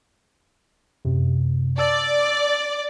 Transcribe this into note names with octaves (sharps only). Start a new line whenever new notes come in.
F#2 C3
D5 A5 E6 A6